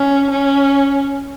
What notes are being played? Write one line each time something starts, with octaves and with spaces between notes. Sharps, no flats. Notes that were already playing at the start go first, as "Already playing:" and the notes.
Already playing: C#4
C#4